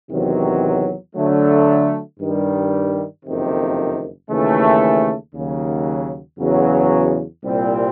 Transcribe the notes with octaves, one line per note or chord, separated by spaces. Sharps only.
E2 C3 D#3 F#3
D3 F#3 A3
G2 D#3 G3
F#1 F2 C3 D#3
D#2 C#3 E3 A3
D#2 C#3 F#3
E2 C#3 F#3
C2 A#2 G3 C4